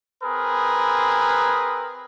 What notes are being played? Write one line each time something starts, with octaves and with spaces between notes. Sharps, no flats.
C4 G#4 A#4 B4